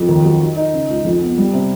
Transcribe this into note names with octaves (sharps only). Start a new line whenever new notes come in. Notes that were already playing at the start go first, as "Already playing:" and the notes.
Already playing: F2
D#2
F#3
D#4
D#4
C#3
C#2
F2
B3
G3
C3